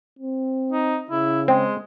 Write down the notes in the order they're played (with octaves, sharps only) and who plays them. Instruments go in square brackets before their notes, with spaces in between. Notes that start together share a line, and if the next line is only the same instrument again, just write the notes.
[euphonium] C4
[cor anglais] D#4
[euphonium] C#3 [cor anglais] E4
[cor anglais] G#3 [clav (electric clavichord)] C4